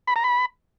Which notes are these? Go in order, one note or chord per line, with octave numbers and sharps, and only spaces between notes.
B5
A#5
B5